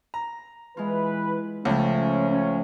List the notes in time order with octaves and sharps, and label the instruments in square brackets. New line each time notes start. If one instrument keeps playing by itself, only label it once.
[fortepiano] A#5
[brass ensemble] E3 B4 [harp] G#3 F4
[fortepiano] C#2 [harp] F3 A3 [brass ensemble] C#4
[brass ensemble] C#4